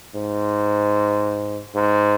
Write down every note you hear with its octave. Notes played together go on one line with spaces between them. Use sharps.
G#2
G#2